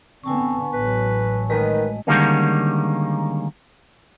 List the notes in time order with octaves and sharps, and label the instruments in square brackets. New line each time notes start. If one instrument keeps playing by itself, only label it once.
[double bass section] D3 B3 [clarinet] C4 [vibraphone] G#5 A5 C#6
[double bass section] A1 F#3 [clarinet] B4
[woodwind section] D#3 [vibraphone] G#3 A3 D#5 [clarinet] B4
[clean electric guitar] D3 D#3 G3 G#3 A#3 C#4